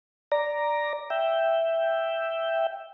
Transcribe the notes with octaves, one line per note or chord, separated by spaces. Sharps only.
D5 A#5
E5 G5